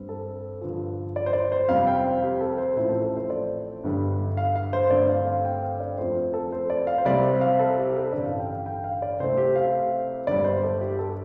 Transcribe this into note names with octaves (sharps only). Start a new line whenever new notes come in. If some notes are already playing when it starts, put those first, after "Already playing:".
Already playing: G2 G3 C4
A4
G2 D3 F3
D5
C5
D5
C5
F2 C3 G3 C4 F5
G5
F5
G4
A4
C5
A1 A2 F3 A3 C4 C5
A4
A4
C5
D5
G1 G2 D3 G3
F5
F5
C5
G2 D3 A3 C4 D5
F5
F5
G5
F5
D5
F2 F3 A3 C4 C5
A4
C5
D5
F5
C5
C2 C3 G3 C4 D5
F5
A4
G4
A4
A1 G2 D3 D5
F5
G5
F5
G5
F5
D5
C2 C3 A3 C4 C5
G4
F5
G1 G2 G3 D5
C5
A4
G4
A4